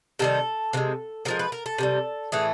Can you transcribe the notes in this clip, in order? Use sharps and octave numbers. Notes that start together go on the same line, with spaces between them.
C3 D#3 G3 A4
C3 E3 G#3
C3 F3 G#3 A#4
B4
A#4
A4
C3 D#3 G3
A2 E3 A3 G#4